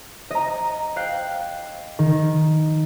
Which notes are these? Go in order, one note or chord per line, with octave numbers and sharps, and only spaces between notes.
D#5 A#5
F5 G5 F#6 C7
D#3